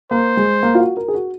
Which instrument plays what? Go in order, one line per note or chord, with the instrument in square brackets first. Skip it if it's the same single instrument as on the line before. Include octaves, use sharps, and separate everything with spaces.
[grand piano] A#3 [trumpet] C5
[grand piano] G#3
A#3
F4
F#4
A#4
G#4
F#4